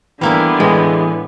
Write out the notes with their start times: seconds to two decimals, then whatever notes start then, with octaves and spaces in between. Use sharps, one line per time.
0.21 D3 E3 G3 A#3 B3 E4
0.60 A2 E3 G#3